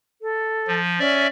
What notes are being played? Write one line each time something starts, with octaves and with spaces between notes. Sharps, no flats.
A4
F3
C#4 D5 E5